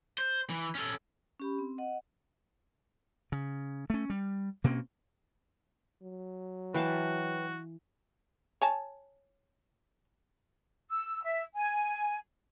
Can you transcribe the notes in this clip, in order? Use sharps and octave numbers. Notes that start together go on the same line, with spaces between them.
C5
E3
C#4 A4
C#4 G4 B5
C4
D#5 F#5
C#3
A3 C#4
G3
B2 A#3 C4 C#4
F#3
E3 F#4 B4 F5 G5 A5
C#5 G#5 A5
E6
E5
G#5